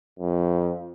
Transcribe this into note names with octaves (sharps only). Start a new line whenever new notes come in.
F2